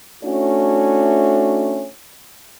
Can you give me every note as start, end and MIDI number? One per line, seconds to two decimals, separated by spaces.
0.23 1.86 57
0.23 1.86 61
0.23 1.86 62
0.23 1.86 64
0.23 1.86 66